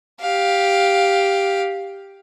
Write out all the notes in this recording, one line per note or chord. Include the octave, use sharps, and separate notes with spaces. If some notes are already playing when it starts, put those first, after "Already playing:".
G4 F5